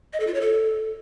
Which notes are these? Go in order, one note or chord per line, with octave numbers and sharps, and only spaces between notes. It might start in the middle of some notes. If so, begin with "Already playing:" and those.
D#5
A4
F4
C#5
A4